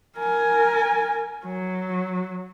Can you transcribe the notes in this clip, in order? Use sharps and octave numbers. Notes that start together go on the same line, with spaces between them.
A#4 G#5
F#3